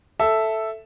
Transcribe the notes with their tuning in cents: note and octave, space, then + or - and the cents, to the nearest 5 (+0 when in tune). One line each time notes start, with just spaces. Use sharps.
A4 +0 E5 +0